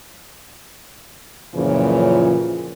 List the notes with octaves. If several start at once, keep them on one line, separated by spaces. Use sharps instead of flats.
F#2 A#2 C#3 E3 F3